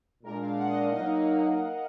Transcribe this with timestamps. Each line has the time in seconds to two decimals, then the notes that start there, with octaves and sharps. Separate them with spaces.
0.23 A#2 G#3 D4 A#4
0.41 F5
0.58 F#5
0.68 D#5
0.75 F5
0.92 F#3 A#3 D#4 D#5